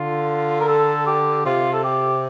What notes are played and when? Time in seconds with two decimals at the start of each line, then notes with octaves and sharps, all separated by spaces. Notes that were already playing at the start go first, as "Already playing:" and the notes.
Already playing: D3 F4
0.60 A#4
0.68 A4
1.07 G4
1.45 C3 F4
1.73 A4
1.84 G4